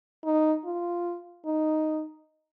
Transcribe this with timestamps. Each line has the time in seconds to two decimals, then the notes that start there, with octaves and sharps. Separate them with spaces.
0.25 D#4
0.65 F4
1.46 D#4